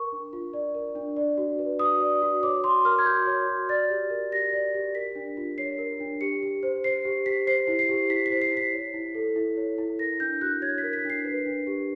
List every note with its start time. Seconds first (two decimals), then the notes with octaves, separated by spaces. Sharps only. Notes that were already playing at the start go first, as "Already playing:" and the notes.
Already playing: A#4 C#6
0.12 D4
0.33 F4
0.54 D5
0.75 A#4
0.95 D4
1.17 D5
1.38 F#4
1.59 B4
1.79 F#4 D#6
2.00 D5
2.22 F#4
2.43 C#5 D6
2.64 F#4 C6
2.85 A#4 F6
2.98 G#6
3.06 F#4 G6
3.27 C#5
3.47 F#4
3.69 D5 A6
3.90 G4
4.10 A#4
4.32 G4 A#6
4.53 D5
4.75 G4
4.95 A#4 B6
5.16 D4
5.37 F4
5.58 C#5 C7
5.78 A#4
6.00 D4
6.21 G4 C#7
6.43 G4
6.63 C5
6.84 C5 C7
7.05 G4
7.26 G4 B6
7.47 C5 C7
7.67 E4
7.79 C7
7.89 G4
8.10 E4 B6
8.26 B6
8.31 C5
8.42 C7
8.52 E4
8.57 B6
8.73 C#5
8.94 E4
9.15 A4
9.36 E4
9.57 C#5
9.78 E4
9.99 A#4 A#6
10.20 D4 G6
10.41 F#4 F#6
10.62 C#5 G#6
10.78 B6
10.83 A#4
10.93 B6
11.05 D4 C7
11.25 B4
11.46 D4
11.67 G4